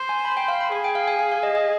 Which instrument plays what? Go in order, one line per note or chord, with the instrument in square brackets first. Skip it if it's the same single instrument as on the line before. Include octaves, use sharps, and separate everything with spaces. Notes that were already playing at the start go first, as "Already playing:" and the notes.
Already playing: [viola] C5
[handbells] G#5
B5
G5
F5
B5
[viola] G#4 [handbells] G#5
[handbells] G5
F5
G#5
F5
F5
D#5
D#5